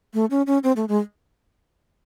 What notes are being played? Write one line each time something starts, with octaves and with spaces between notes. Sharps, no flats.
A3
C#4
C#4
C4
A3
G#3